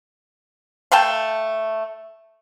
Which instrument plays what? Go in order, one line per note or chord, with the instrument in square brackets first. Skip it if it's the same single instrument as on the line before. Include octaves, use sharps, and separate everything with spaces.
[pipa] A3 F5 G5 A5